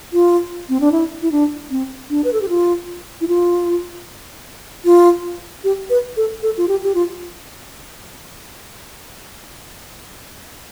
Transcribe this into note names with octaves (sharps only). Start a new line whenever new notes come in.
F4
C4
D4
E4
E4
D4
C4
D4
B4
A4
G4
F4
E4
F4
F4
G4
B4
A4
A4
F4
G4
G4
F4